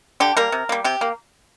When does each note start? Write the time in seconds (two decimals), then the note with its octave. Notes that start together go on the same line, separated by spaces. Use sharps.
0.20 D3 G4
0.37 G3 A#3 A#4
0.52 C3
0.69 G3 A#3
0.84 C3 G4
1.01 A#3